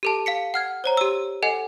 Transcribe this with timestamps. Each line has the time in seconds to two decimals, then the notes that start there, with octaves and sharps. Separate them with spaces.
0.03 G4 A4 A5
0.26 F5 B6 C#7
0.54 F#5 F6 G#6
0.84 C5 C#5 A#5
0.97 G4 E6
1.43 A4 D#5 F#5 G#5